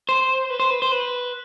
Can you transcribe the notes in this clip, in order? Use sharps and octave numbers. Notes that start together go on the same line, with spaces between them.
C5
B4
C5
B4
C5
B4